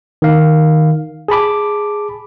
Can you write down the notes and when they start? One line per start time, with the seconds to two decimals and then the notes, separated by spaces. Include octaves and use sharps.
0.22 D#3 F5
1.28 G#4 A5 B5 D6